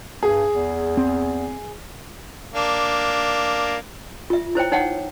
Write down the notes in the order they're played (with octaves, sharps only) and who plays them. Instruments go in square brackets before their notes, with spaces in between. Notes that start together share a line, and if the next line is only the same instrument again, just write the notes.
[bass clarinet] G2 [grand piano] G#4
[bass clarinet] E2
[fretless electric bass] C4
[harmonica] A#3 D4
[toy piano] F4 E5
E4 C5 C#5 G5
D#4 C#5 F#5 G5